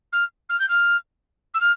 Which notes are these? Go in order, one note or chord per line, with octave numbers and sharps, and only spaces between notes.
F6
F6
G6
F6
E6
F6